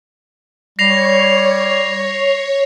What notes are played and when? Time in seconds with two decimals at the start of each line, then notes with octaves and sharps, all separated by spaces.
0.79 G3 C#5 A#6 C7 F7